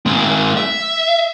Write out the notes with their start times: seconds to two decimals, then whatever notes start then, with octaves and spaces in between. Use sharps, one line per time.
0.06 G#3 C4
0.57 E5